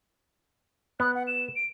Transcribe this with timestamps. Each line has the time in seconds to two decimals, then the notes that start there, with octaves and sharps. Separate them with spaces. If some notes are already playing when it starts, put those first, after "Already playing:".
1.00 B3 F#6
1.15 F#5
1.27 E7
1.56 D7